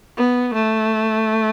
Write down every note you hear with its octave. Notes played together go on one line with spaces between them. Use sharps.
B3
A3